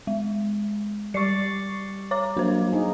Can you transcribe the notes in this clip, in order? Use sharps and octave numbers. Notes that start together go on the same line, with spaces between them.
G#3
G3 D5 C#6 C7 C#7
C#5 A#5 D6
F#3 A#3 D4 C5
D#4 G#4